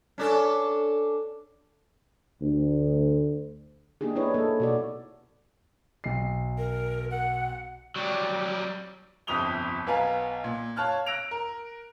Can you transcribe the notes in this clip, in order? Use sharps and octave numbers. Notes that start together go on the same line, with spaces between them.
C#4 D4 A4
D2
A#3 D4 D#4 G4 G#4
B3 D4 E4 B4 C#5 D#5
A#3 A4
B2 F#4 D5
B1 C7
A#4
F#5
F#3 G3
G1 C2 F2 D#6 F7 G7
B1 B3 B4 F5 G#5 A#5
A#2
C#5 F5 A5 F6 F#6
E6 F#6 A#6 D7 F7
A#4